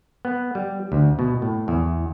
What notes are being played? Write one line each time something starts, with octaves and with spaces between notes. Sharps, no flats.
B3
G3
D2
B2
A2
E2